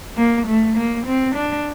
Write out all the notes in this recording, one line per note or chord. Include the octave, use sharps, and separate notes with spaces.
A#3
A3
A#3
C4
D4